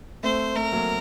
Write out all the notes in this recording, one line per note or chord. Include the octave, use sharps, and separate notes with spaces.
A3 C4 C5
A3 A#4
F#3 A#3